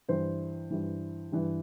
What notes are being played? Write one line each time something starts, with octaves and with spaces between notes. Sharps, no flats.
G2 E3 C5
G2 E3
G2 E3